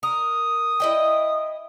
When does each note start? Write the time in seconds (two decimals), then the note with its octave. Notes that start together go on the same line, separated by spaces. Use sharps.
0.03 A#4 D#6
0.80 E4 D#5 G5